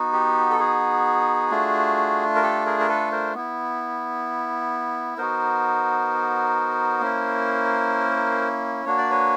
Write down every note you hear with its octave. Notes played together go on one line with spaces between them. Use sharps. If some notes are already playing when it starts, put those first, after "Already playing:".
Already playing: B3 D#4 F#4
G4
A4
F#4 G#4
A3 D4 F4
A#4
G4 A4
G#4 A#4
A#4
A4 B4
A#4 C5
B3 E4
B3 D#4 F#4 A#4 C5
A#3 C#4 E4
A#3 D4 F#4 C#5
D5
B4 C#5